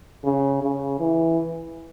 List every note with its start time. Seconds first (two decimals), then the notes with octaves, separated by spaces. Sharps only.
0.25 C#3
0.63 C#3
1.00 E3